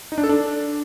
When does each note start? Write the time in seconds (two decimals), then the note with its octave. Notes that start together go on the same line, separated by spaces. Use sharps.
0.12 D#4
0.18 D4
0.24 A4
0.29 D4